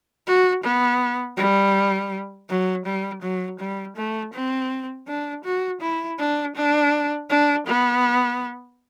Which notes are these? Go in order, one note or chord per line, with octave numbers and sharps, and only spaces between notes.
F#4
B3
G3
F#3
G3
F#3
G3
A3
C4
D4
F#4
E4
D4
D4
D4
B3